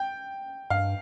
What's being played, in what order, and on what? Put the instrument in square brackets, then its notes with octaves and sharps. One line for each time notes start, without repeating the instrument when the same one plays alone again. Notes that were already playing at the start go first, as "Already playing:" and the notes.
Already playing: [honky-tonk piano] G5
[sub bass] G2 [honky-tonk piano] F5